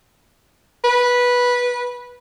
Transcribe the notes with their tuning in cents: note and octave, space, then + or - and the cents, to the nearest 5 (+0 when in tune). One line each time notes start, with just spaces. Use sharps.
B4 -15